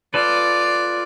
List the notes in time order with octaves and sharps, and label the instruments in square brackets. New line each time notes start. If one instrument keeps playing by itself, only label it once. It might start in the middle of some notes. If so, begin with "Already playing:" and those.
[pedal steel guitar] F4 A4 B4 [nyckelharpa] D5